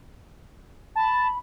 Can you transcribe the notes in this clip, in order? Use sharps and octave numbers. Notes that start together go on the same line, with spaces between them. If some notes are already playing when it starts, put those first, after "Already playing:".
A5 B5